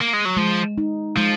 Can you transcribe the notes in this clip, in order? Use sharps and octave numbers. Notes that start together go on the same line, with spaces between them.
A#3
G#3
F#3
F3 G#3
D#4
F3 G#3